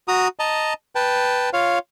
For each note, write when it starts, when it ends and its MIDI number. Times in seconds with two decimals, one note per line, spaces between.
0.08 0.28 66
0.08 0.28 82
0.08 0.28 87
0.39 0.74 75
0.39 0.74 81
0.39 0.74 82
0.95 1.50 71
0.95 1.50 79
0.95 1.50 81
1.53 1.79 65
1.53 1.79 73
1.53 1.79 77